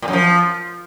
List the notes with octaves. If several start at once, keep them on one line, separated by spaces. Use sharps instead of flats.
A#2
F#2
F3